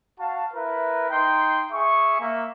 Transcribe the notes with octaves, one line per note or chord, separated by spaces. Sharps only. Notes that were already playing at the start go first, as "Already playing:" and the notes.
F#4 F5 A5
E4 A#4 B4
D#4 G5 C6
G#4 E5 C#6
A#3 E5